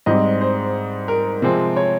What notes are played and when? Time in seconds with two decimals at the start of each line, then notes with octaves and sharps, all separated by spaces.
0.06 G#2 G3 C4 D#5
0.41 C5
1.08 A#4
1.42 C3 F3 G#3 C4
1.77 C#5